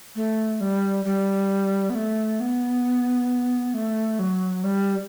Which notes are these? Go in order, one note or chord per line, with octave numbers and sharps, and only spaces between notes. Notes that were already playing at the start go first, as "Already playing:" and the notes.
A3
G3
G3
B3
A3
B3
A3
F#3
G3